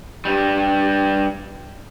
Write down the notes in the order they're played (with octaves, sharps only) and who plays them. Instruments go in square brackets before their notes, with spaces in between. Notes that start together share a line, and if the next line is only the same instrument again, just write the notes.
[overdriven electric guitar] G2 G3